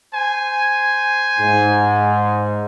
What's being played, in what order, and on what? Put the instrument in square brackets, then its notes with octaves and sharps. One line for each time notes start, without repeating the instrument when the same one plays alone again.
[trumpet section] C5 G#5
[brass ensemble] G#2